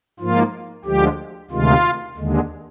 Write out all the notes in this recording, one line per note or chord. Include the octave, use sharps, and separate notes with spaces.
G#2 F3 A#3 F4
D2 D3 F3 G#3 G4
D2 C3 D#3 G#3 F4
D#2 D3 G#3